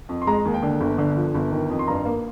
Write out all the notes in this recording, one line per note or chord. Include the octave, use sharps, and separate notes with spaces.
F2
C6
G#3 A#5
D#2
G5
D3
G1
D3
F3
G1
D#3
F2
C6
G2 A#5
A#3